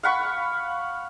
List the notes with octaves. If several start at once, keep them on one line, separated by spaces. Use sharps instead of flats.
F5 F#5 B5 C#6